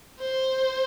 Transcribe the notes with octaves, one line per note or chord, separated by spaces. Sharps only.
C5